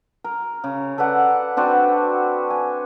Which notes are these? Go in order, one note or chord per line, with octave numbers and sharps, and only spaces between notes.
A#4
C#3
A4 B4 D5 F#5
C4 D4 F#4 B4
G#5